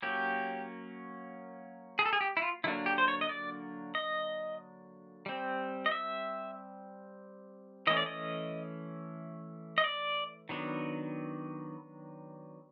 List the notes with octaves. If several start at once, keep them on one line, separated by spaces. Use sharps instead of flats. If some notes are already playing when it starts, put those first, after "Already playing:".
F#3 A#3 C#4 G4
G#4
A4
G#4
G4
E4
F4
D3 F#3 A#3 D4 E4
G4
C5
C#5
D#5
D5
D#5
G3 C4
D#5
E5
E3 A3 C#4 D#5
D5
D#5
D#5
D5
D#3 F#3 B3 D4